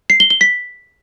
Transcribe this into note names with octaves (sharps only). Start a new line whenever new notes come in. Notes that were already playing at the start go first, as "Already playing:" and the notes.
C7
G7
G7
B6